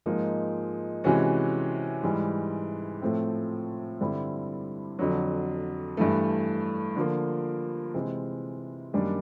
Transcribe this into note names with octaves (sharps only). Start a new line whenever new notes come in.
G#2 F3 A#3 D#4
C3 E3 G#3 C#4 F#4
G#2 E3 G3
A2 F3 A3 C4
G2 D3 G3 C4 E4
F2 D3 F#3
G2 E3 A3
D3 F3 A#3
C3 E3 G#3 C4
F#2 D#3 G3 A#3 D4